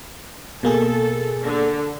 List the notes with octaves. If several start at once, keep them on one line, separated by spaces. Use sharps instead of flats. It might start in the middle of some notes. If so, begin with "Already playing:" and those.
B2 A#3 G#4 A4
D3